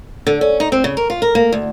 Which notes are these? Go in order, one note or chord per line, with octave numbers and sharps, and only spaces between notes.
D3
C#4
D#4
C4
C#3
A#4
F4
A#4
A#3
D2